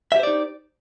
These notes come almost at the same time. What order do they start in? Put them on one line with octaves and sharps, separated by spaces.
E5 G4 C5 D5 D#4